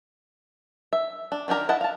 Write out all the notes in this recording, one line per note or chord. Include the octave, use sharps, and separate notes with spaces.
E5
D4
D#3 D4 G4 A#4 A#5
E4 D#5 F#5 A5
F5 A5